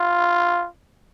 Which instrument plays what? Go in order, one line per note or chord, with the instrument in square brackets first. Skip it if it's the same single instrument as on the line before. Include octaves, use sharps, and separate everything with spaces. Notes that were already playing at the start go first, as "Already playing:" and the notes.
Already playing: [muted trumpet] F4